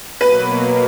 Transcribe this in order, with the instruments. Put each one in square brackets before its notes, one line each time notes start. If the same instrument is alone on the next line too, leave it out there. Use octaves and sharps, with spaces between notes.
[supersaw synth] B2 F#3 A#3 [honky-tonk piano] B4